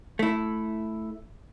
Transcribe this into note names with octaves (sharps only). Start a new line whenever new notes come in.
A3 E4